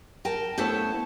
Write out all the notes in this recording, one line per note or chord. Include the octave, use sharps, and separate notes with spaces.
A#4 G5 A5
A3 B3 E4 C5 C#5 A5